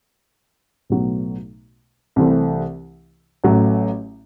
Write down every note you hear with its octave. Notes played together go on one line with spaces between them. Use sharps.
B1 A2 F#3 B3
C2 C3 E3 A3 C4
A1 A2 F#3